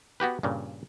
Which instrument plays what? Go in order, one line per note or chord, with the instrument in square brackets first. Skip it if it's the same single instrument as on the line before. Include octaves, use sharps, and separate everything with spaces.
[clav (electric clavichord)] B3 F#4 G4 B4
G2 A#2 C#3